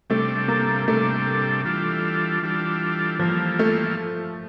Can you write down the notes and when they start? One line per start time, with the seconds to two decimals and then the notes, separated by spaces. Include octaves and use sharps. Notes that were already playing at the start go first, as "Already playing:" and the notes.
0.10 C3 G3 A3 D4 A4
0.48 A#3
0.88 C3 G3 A3 D4 A4
1.65 E3 G3 D4 F4 A4
2.43 E3 G3 D4 F4 A4
3.19 E3 F3 G3 A#3 F4 A4
3.59 A3